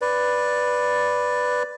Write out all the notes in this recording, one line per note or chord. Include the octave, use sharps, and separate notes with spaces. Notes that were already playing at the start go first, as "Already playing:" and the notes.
B4 D5